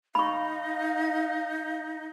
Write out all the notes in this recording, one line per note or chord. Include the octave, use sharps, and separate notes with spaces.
D#4 F5 B5 C#6